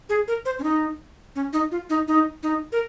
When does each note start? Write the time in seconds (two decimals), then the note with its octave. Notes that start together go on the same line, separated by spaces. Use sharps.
0.09 G#4
0.28 A#4
0.45 C5
0.59 C#4
0.64 D#4
1.36 C#4
1.53 D#4
1.71 F4
1.90 D#4
2.08 D#4
2.43 D#4
2.72 A#4